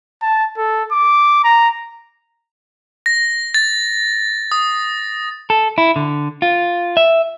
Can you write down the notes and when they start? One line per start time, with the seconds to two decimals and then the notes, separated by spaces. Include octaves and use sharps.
0.22 A5
0.57 A4
0.92 D6
1.44 A#5
3.06 A#6
3.54 A6
4.52 D#6
5.50 A4
5.78 E4
5.96 D3
6.42 F4
6.97 E5